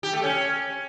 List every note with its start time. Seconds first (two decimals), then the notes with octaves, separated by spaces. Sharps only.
0.03 G4
0.13 A3
0.23 C#4